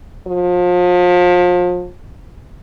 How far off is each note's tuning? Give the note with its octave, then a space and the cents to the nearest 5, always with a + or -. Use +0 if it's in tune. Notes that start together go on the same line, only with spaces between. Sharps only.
F3 +35